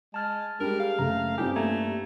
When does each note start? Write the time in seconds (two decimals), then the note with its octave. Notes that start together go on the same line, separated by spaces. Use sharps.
0.14 G#3 A5 F6 A6
0.61 G3 G#3 D4 A#4
0.80 F5
0.99 F#1 A3 A#5
1.38 G2 C4 C#4 D#4 E4 G4
1.56 A3 A#3 G4 A#5 G#6